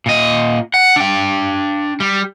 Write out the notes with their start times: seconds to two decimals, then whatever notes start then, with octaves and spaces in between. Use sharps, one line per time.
0.06 A#2 D#5
0.74 F#5
0.96 D4 G5
2.00 G3